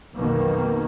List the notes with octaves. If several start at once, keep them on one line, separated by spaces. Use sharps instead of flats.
B1 F2 B2 D#3 A#3